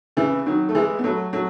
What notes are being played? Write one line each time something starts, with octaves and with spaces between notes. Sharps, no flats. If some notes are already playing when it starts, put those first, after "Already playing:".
C#3 E3
D#3 F#3
A3
E3 G#3
B3
F#3 A3
F#3 A3